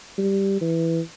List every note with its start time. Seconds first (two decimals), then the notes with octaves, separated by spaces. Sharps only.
0.18 G3
0.61 E3